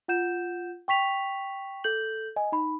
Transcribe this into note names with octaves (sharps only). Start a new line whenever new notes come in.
F4 F#5 G6 E7
G5 C#6 B6 F7
A4 G6 F#7
D#5 G#5
D#4 B5